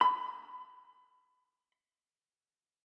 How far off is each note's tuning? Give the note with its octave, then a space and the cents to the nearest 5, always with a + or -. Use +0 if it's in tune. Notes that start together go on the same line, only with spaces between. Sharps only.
B5 +25